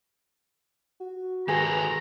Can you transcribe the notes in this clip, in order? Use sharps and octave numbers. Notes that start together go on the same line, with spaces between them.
F#4
D#3 G#4 A4 B4 A#5